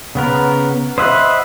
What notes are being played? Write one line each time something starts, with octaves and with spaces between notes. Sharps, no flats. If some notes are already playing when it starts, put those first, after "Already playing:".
C#3 B3 A#4
C5 D#5 E5 F#5 B5